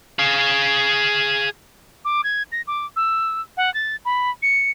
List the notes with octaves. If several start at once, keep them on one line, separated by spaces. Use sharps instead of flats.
G#4 F5
D6
G#6
A#6
D6
E6
F#5
A6
B5
C#7